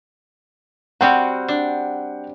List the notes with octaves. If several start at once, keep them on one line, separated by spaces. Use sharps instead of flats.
G3 C4 F#4 F#5 G5
D4